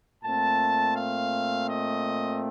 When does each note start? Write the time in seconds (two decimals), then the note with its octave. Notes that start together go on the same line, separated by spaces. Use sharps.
0.22 A#2 A3 C4 A5
0.94 F5
1.67 D#5